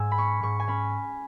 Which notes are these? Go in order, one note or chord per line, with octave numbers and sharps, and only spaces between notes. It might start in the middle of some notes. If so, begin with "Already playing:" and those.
Already playing: G#2 G#5 E6
B5
C#4 C#6
G#2 C#6
G#5
C#4 B5